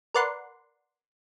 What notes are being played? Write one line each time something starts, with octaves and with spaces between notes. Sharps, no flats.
A#4 B4 D5 F#5 C6